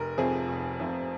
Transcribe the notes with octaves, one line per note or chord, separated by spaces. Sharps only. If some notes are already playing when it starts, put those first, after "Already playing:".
Already playing: F1 A#4
F2 C3 F3 G#4
F1
F2 C3 F3